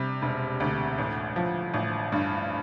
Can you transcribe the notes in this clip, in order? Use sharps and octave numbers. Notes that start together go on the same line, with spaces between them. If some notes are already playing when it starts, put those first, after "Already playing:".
Already playing: C3 G3
E1
D2
A1
F3
A1
G2